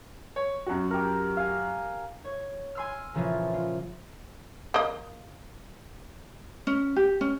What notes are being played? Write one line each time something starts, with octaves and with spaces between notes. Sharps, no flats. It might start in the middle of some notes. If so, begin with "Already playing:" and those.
C#5
F#2 F#4
G4 A#4
F5 G#5
C#5
G#5 C6 E6 F6
A#2 C#3 E3 F3 F4 G#4
F4
A#3 D#5
C#4
G4
C#4